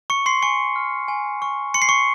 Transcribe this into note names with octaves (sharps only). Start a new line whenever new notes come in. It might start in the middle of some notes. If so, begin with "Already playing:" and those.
C#6 C#7
C6 C7
G#5 C#6 C#7
F6
G#5
C#6
C6 C#7
C7
C#6 C#7